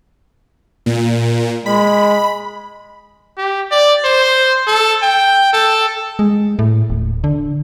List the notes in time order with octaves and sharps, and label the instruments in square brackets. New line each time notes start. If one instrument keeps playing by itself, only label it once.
[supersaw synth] A#2
[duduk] G#3 [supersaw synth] B5
[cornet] G4
D5
C5
A4
G5
A4
[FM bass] G#3
A2
D#1
D3